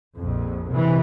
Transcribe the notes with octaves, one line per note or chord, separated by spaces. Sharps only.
A#1 F2
C3 E3